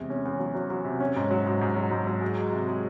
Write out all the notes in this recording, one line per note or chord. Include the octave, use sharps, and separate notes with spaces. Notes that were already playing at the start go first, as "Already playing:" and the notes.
Already playing: E2 C3 G#3
C#4
E2
F#3
F#3
F#3
C3
C#4
G#2
F#3
G#2
G#2
F#3
G#2
F#3
G#3
G#3
C3
G#3